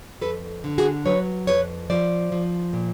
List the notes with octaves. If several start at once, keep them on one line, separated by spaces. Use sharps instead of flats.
F2 A4 B4
D3
F#4 G#4
F#3 B4 C#5
F2 B4 C#5
F3 C5 D5
F3
A#2